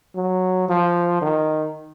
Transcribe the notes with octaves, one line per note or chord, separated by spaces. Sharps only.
F#3
F3
D#3